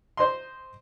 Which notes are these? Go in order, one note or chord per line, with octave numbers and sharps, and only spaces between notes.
C5 D#5 C6